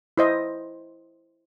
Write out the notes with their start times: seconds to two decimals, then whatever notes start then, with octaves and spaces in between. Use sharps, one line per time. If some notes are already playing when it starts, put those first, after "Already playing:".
0.18 E4 C5 D#5